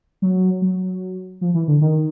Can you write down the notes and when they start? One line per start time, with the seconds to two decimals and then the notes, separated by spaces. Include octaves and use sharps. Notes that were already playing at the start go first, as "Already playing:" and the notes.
0.22 F#3
0.62 F#3
1.41 F3
1.54 E3
1.68 D3
1.81 D#3